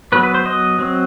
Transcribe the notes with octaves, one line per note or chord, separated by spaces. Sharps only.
F#3 B3 B4
B4
C5
D#5
F#3 C4